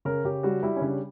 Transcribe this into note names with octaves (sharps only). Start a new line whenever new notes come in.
C#3 A#4
C#3 G4
G3 F#4
G3 E4
C#4
C#3 D4